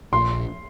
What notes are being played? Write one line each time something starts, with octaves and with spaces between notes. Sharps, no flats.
A#1 C6